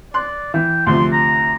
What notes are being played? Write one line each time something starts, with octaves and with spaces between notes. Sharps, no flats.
D5 C6 F#6
E3 G5
D2 C3 F3 C6
A#5